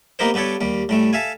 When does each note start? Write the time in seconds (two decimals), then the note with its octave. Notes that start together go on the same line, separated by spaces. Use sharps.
0.19 A#3 B3 D#4 G4 A#4 C5
0.34 G2 B3 G4 A4 C#5
0.61 D#2 G3
0.89 A2 G3 A3
1.13 A4 E5 F5 G#5